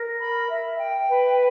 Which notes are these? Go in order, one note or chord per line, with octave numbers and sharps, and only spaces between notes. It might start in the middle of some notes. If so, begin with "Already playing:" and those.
Already playing: A#4
B5
E5
G5
B4